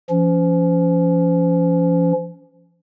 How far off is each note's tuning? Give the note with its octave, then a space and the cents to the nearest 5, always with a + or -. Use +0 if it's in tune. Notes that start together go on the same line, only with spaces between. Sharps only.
F3 -35 C#4 +30